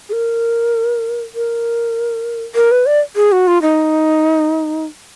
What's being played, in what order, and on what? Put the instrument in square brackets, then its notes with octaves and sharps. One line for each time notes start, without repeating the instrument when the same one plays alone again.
[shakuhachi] G#4
A#4
A#4
A#4
B4
D5
G#4
F#4
F4
D#4